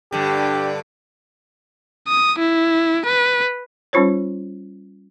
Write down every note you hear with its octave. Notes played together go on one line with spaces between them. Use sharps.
G2 D3 G4
D#6
E4
B4
G3 C#4 D#4 F4 C5 C#5